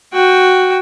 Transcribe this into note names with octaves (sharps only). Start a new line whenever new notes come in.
F#4 G5